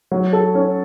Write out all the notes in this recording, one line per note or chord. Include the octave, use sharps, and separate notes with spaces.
F#3
A4
C#4